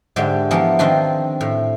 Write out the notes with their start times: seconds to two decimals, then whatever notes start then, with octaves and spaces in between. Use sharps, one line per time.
0.16 G#2 D3 D4 G4 E5
0.51 E3 F3 B3 A4 A#4
0.79 D#3 C4 D4 F4
1.41 A2